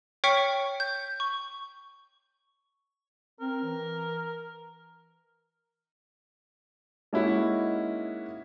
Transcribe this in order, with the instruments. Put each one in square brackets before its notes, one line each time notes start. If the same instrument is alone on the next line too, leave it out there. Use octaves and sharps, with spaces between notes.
[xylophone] C#5 G5 C#6 F6 B6 C#7
G6
C#6
[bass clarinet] C4 [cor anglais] A#4
[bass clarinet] E3
[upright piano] G#3 A#3 C#4 D#4 E4 F#4